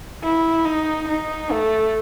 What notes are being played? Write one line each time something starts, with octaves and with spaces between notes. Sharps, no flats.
E4
D#4
D#4
A3